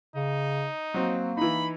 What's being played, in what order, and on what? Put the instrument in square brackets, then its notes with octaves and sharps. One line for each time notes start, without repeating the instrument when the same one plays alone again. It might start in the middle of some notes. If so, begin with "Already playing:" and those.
[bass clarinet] C#3 [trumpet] D#4
[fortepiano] F#3 C4 [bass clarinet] A#3
[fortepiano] E3 D#4 [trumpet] B5